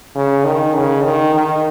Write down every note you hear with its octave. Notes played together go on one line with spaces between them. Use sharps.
C#3
D#3
C#3
D#3
D#3